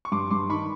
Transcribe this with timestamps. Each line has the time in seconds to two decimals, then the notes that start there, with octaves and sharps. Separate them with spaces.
0.05 C#6
0.12 G2 C6 D6
0.30 G2 C6 D6
0.49 D#3 B5 C#6